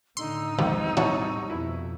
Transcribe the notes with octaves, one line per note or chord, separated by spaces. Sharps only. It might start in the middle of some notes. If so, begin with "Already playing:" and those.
A2 D3 D#4 C6 E6
B1 E2 G#2 D#3 F3 G3 C4
A2 C3 E3 G3 F#4 C#5 A5
F2 B2 E4